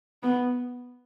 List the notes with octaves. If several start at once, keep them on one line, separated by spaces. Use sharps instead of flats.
B3